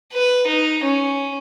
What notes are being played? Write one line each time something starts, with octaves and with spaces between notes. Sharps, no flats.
B4
D#4
C#4